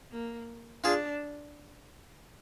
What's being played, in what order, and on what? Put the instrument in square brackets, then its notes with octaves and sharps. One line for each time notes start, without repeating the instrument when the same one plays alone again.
[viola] A#3
[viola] D4 [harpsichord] F4 G#4